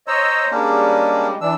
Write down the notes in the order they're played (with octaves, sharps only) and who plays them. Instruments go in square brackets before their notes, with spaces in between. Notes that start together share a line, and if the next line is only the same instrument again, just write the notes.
[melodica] C5 A#5 [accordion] C#5 D#5 E6
[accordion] G3 G#3 [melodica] A#3 C#4 D4
[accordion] E3 D4 [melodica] E6